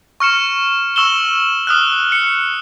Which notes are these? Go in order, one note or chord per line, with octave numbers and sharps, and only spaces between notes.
C#6 F6 C#7 E7
C#6 E6 E7 G7
D#6 F6 F#6
C#7